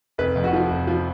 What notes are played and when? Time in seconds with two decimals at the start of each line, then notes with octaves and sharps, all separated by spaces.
0.18 F1 B4
0.36 F2
0.44 F#4
0.53 F3
0.70 F1
0.87 F3